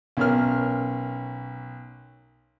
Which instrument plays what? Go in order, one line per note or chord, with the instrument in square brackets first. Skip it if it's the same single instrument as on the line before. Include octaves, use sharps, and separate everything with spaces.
[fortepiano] B1 C#4 A#4 F6